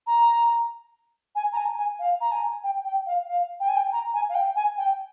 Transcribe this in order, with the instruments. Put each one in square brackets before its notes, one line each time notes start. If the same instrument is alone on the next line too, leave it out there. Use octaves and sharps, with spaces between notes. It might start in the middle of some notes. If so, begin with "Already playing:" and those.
[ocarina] A#5
G#5
A#5
G#5
G#5
F5
A#5
G#5
G5
G5
F5
F5
G5
G#5
G5
A#5
G#5
F5
G5
G#5
G5